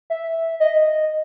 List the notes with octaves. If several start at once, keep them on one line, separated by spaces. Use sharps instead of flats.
E5
D#5